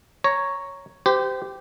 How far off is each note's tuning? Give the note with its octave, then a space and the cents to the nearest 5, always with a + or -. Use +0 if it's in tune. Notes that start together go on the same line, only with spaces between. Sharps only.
C#5 +0 A#5 +0
G4 -5 C5 -30